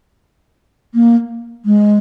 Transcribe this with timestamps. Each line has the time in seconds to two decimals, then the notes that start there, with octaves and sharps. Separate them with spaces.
0.95 A#3
1.65 G#3